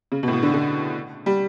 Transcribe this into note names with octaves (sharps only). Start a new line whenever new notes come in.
C#3
B2
A2
B2
D3
D3
G3